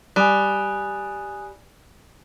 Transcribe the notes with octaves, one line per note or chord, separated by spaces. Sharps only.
G3 G#5 D#6 F#6